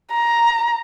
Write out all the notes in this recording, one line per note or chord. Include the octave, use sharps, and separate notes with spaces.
A#5